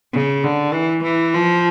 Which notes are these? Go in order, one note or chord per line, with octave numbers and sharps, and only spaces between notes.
C#3
D3
E3
E3
F3